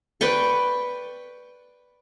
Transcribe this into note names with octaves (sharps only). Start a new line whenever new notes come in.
B4 D5 G5 C#6